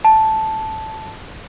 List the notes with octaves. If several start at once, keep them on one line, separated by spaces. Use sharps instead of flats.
A5